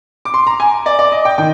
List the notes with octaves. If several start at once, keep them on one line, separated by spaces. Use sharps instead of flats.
D6
C6
A#5
G#5
D5
D5
D#5
G5
D#3 G5